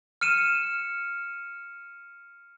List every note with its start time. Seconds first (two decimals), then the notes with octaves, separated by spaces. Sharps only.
0.21 F6 C#7 D#7 E7